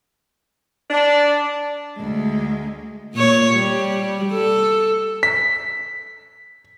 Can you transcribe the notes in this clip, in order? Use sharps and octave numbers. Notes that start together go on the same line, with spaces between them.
D4
D2 G#3
A#2 C#5
G3
A4
B6